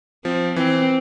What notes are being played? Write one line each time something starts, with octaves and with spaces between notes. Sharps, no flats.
F3 C4
E3 C4